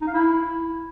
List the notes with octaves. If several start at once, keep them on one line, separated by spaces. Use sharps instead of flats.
D#4
F5
E4